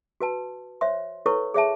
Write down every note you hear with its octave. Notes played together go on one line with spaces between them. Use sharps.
F#4 B4 A5
C5 C#5 E5 C6
E4 A4 B4 C#5 C#6
G#4 C#5 E5 A5